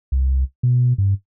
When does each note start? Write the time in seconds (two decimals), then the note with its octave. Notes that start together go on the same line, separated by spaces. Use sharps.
0.12 C2
0.63 B2
0.98 G2